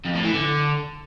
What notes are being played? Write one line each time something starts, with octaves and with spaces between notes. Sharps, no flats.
F2
A2
E3
D3